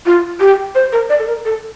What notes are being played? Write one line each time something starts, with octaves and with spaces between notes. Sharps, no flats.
F4
G4
C5
A#4
D5
A4
A#4
A4